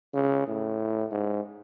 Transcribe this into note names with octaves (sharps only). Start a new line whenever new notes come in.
C#3
A2
G#2